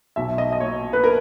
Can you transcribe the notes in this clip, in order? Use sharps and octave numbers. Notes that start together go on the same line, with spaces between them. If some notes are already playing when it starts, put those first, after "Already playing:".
B1 E5
D#5
D#5
A#2 C#5
B4
A#4